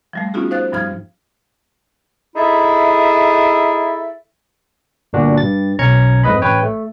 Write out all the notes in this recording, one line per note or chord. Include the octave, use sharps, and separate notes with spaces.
F3 G3 A3
B3 C#4 D#4 F4 F#4 G#4
D#4 C5 F5 F#6 A6
G2 F3 G3 D#4 F6 G#6
D#4 E4 G#4 A4 E5
G1 A#2 D4 F#4
G2 A6
B1 C#4 A#5 G#6 C#7
F2 G#2 B4 D#5 B5
A1 B4 C#5 G5
A3